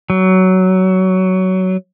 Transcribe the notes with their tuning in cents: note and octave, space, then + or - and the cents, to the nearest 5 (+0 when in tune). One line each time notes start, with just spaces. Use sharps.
F#3 +15